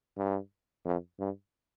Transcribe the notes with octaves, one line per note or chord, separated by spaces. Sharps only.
G2
F2
G2